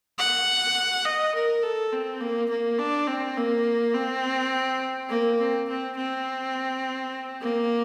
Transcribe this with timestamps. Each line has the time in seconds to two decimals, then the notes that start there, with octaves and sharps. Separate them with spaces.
0.18 F#5
1.05 D#5
1.35 A#4
1.63 A4
1.92 C4
2.21 A#3
2.49 A#3
2.78 D4
3.07 C4
3.37 A#3
3.94 C4
5.10 A#3
5.39 C4
5.68 C4
5.97 C4
7.41 A#3